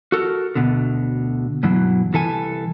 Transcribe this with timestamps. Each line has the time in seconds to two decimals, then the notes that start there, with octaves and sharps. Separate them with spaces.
0.12 F#4 A4 A#4
0.55 D2 B2 D3
1.63 G2 B2 E3 F#3
2.13 C2 E3 A4 G#5